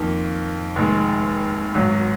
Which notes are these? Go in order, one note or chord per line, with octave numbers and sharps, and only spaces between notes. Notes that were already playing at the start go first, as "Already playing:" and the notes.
Already playing: F2 D#3 A#3
F1 D#2 D#3 G#3
G#1 G#2 F#3